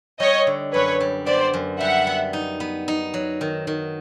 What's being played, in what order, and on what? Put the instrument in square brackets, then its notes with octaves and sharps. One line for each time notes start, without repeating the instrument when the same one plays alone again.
[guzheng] G3 [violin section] C#5 D#5
[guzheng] D3
[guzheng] F#2 [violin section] B4 C#5
[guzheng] G3
[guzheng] B3 [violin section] C5 D5
[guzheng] F#2
[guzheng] G3 [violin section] E5 F#5
[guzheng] B3
D#4
B3
D#4
F#3
D#3
D#3